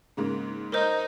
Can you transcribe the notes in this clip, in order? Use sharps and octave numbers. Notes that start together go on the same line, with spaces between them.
G#2 C#3 A#3
D#4 A#4 C5